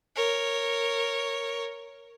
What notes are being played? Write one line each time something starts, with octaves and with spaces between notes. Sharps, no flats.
A#4 C#5